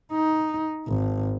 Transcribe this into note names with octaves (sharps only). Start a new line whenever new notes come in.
D#4
G#1